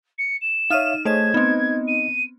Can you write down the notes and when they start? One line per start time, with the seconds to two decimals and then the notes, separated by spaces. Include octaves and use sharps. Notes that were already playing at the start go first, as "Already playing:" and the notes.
0.18 C#7
0.41 E7
0.70 D#4 C#5 E5 F5 F6 D#7
1.05 A3 G#4 C5 C#5 D#5 G#6 E7
1.34 B3 C4 D#4 D#5
1.87 D#7